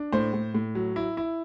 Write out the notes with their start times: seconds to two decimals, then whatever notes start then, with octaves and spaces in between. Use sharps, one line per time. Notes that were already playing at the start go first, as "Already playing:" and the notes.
Already playing: D4
0.12 A2 C5
0.33 A2
0.54 A2
0.75 F#3
0.96 E4
1.17 E4